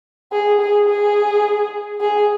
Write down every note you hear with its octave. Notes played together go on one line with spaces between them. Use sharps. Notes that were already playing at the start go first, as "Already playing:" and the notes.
G#4
G#4
G#4
G#4